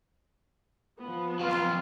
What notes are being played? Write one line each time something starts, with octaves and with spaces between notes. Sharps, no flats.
F3 B3
F2 F#3 F4